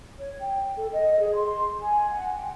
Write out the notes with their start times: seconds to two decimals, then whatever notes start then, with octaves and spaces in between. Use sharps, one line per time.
0.20 C#5
0.40 G5
0.77 A4
0.92 D#5
1.18 G#4
1.36 C6
1.80 G#5
2.10 F#5
2.36 G5